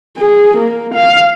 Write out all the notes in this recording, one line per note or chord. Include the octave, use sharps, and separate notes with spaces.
G#4
A#3
F5